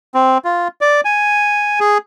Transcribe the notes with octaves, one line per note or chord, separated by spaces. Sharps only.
C4
F4
D5
G#5
G#4